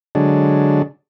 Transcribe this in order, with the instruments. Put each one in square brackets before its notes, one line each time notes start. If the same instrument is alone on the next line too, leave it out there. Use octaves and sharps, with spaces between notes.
[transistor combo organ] D3 F#3 G#3 D4